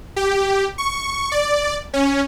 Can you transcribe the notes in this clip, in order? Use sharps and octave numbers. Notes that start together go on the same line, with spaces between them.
G4
C#6
D5
C#4